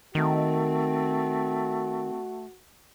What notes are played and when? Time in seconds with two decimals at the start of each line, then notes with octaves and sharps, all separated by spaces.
0.15 D#3 A3 C4 F#4